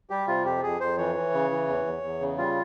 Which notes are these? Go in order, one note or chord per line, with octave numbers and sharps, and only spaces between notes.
G3 G4
C3 F4
F2 G4
F2 G#4
F2 C5
E3 C#5
E3
C#3
E3
E2
E2
E2
C#3
G3 F4